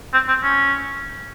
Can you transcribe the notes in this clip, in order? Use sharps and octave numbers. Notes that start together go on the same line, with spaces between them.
C4
C4
C#4